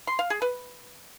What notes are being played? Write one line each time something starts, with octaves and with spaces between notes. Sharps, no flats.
C6
F5
G#4
B4